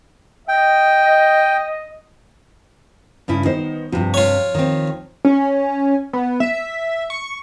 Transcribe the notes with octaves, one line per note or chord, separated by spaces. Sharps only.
D#5 G5
G2 C#3 E4
D#3 B3 D#4 C5
G2 C3 F3
F4 C#5
D#3 C4
C#4
B3
E5
C#6